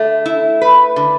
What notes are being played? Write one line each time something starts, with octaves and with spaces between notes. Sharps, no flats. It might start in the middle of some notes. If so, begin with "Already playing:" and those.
Already playing: D3 A3
E4
B4
D3